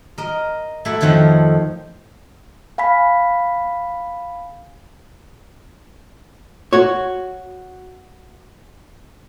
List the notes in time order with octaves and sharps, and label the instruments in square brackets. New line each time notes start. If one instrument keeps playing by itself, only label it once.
[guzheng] A#4 D#5
A3 E4 F#4
F2 D#3 F3 C#5 F#5
[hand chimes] F5 G#5 B5 B6
[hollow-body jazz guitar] F#4 C#5